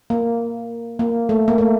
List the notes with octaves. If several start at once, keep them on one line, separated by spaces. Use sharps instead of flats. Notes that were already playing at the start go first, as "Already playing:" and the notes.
A#3
A#3
A3
A#3
A3